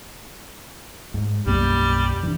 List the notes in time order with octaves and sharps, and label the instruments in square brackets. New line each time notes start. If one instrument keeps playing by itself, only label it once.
[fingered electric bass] G#2
[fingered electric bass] B1 F#2 A#3 [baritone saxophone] G3
[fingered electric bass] E3 D4